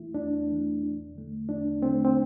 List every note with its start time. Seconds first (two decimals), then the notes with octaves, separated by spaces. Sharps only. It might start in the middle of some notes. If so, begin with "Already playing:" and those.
Already playing: E2 E3 A3 E4
0.14 E2 D4
0.47 E3 A3
0.82 E2
1.15 D3 A3
1.49 E2 D4
1.82 D3 A3 C4
2.04 C4